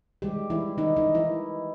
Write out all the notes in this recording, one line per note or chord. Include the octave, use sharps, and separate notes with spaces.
D#3 G3 G#3 G4
E3 E4
D#3 D#4
D#3 D#4
E3 E4